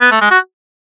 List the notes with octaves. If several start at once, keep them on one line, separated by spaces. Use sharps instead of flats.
B3
A3
G#3
F#4